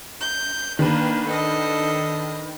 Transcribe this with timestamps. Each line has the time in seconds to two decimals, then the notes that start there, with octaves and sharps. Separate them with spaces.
0.20 G6
0.79 D#3 A#3 D4 B4
1.29 D4 A4 D#5